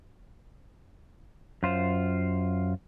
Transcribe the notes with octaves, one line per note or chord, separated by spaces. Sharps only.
F#2 F4 C5